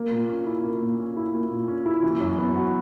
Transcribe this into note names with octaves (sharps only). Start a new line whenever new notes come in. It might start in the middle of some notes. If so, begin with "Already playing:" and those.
Already playing: A#3
A#2
C#4
E4
A#3
A#2
C#4
E4
A#3
A#2
C#4
E4
E3
F#2
B3
F#4